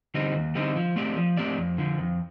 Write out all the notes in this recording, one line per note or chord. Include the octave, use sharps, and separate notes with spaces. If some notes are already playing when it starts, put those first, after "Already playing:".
D3 G3 C4 D#4
D#2
D3 G3 C4 D#4
F3
A3 C4 G4 D5
F3
A3 C4 G4 D5
F2
D3 F3
F2